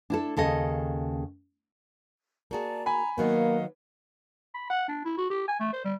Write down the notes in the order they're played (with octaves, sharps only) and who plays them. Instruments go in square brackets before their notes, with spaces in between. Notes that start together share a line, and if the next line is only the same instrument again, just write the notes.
[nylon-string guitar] D4 E4 A4
D#2 C#3 A4 D#5
[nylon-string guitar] A#3 F#4 G#4 [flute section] D5 A5 A#5
[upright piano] G#5 B5 [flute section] A#5
[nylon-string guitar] D#3 F#3 B3 [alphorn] A#3 [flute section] D#5 F5 F#5
[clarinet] B5
F#5
D4
E4
F#4
G4
G#5
A3
C5
G3